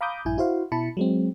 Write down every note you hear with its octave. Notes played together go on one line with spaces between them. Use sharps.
F5 A#5 B5 D6 D#6 G6
A#1 G2 E4 G#5 G6
E4 F#4 C5 F5
B2 E4 A5 B5 C#7
F#3 G#3 C4